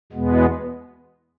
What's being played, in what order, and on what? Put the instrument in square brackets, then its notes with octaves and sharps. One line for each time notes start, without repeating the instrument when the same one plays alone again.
[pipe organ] E2 B2 G#3 B3